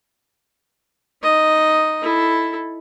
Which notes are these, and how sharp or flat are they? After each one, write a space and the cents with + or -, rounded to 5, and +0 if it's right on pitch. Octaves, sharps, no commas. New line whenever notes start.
D#4 +0 D#5 +0
E4 +0 A4 -5